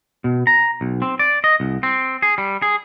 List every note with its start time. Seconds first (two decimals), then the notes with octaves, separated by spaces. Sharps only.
0.24 B2
0.47 A#5
0.81 B1
1.02 C4
1.19 D5
1.44 D#5
1.60 C2
1.83 C4
2.22 G#4
2.38 G3
2.62 G#4